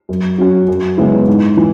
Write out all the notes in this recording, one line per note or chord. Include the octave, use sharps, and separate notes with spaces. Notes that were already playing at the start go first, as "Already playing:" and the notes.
F#2
F#3 C#4 F#4
F#2
C#3 G#3 B3 E4
G#2
E3